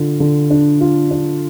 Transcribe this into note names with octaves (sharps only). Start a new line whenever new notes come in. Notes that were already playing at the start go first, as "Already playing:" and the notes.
Already playing: D3 F4
D3
D4
F4
D4